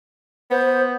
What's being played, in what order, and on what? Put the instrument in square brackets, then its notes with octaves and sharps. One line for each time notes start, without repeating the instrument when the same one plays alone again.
[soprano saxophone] B3 [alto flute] C5